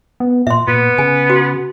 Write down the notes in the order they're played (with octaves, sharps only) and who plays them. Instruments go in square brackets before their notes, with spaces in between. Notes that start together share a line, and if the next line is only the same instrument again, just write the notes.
[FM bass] B3
[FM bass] A#2 [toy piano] E5 C6
[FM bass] A#2 [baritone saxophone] B3
[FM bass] C#3 [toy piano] G#5
[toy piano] F#4